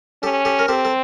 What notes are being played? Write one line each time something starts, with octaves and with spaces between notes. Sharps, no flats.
C#4 G4 A4
G4 A4
A#4
C4 G4 A4
A4